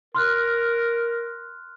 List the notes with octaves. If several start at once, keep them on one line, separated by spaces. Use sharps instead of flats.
A#4 C6 F6 F#6